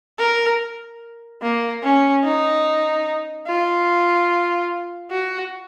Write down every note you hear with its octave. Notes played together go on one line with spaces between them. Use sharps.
A#4
A#3
C#4
D#4
F4
F#4